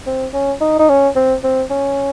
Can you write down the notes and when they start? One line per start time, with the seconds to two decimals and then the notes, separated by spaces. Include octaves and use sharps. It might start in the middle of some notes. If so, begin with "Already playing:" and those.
0.07 C4
0.34 C#4
0.61 D#4
0.79 D#4
0.89 C#4
1.16 C4
1.44 C4
1.70 C#4